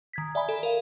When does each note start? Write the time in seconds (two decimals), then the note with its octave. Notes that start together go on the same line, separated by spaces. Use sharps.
0.13 D#3 G#6 B6
0.35 D5 E5 G#5 B5
0.49 A4
0.63 A#4 F5